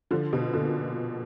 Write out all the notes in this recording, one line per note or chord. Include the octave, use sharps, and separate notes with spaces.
D3 F3
B2
A#2 D3